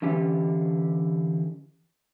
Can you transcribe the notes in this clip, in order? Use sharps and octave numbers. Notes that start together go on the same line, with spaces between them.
D3 E3 C#4 G4